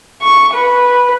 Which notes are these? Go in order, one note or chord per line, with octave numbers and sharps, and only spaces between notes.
C#6
B4